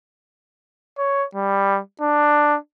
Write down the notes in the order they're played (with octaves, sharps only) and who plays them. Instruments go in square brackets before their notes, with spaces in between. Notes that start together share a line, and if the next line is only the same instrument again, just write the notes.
[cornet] C#5
G3
D4